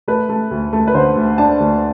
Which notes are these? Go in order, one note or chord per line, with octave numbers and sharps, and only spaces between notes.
A3 B4
A3
D2
A3
B4
D3 C5
D2
D4 A5
D2